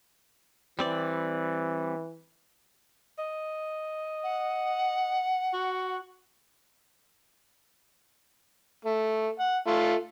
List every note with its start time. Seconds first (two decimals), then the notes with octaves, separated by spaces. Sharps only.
0.79 E3 G3 C4 D5
3.19 D#5
4.23 F#5
5.53 F#4
8.85 A3
9.39 F#5
9.67 A3 F4